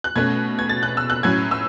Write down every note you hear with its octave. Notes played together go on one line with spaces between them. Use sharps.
F#6
B2 A3 C#4 G#6
G#6
A6
F#6
E6
F#6
A2 F#3 C#4 G#6
E6